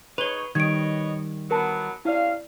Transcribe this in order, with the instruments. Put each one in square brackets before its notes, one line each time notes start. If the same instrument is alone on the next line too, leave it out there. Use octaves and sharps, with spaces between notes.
[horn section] D#4 G#4 C#5 [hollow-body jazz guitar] B4 [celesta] F7 G7
[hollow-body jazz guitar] D#3 G3 [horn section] B4 C#5 D#5 [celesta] G#6 D7
[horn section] E3 F#3 B3 [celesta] A#4 A5
[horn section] C3 C#4 F5 [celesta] E4 D5